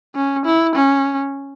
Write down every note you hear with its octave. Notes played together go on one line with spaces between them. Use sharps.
C#4
E4
C#4